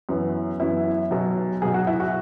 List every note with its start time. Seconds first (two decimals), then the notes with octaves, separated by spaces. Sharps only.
0.09 F#2 E3 B3
0.60 F#2 E3 B3 E4
1.11 B1 B2 F#3
1.62 B1 B2 F#3 G#4
1.74 F#4
1.87 E4
2.00 F#4